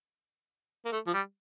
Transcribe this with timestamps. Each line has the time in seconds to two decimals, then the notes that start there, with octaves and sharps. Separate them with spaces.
0.85 A#3
0.92 A3
1.07 F3
1.14 G3